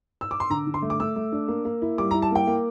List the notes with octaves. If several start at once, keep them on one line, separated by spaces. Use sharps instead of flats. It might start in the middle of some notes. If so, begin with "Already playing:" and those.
E6
D6
C6
D3 A#5
D3
C6
A3
D6
A3 E6
A3
D4
A#3
A#3
E4
G3 D6
A#5
E4
A5
A#3 G5
A#3